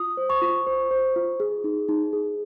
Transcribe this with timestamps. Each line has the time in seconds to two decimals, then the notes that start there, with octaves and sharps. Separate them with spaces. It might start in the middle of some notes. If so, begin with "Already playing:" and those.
Already playing: F4 D#6
0.17 C5
0.30 C#6
0.42 F4
0.67 C5
0.91 C5
1.16 F4
1.40 G#4
1.64 D#4
1.89 D#4
2.13 G#4